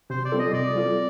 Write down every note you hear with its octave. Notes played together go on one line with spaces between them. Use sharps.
C3 C5
D5
G3 C4 F4 A4
D#5
C3 D5
G3 C4 F4 A4